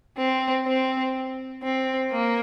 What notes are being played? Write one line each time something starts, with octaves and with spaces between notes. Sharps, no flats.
C4
C4
C4
A#3